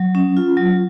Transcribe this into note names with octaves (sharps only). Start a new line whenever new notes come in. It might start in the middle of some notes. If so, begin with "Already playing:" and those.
Already playing: F#3
C#4
F4
F#3